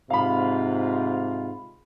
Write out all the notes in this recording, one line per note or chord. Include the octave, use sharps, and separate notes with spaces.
G#2 C3 F4 F5 B5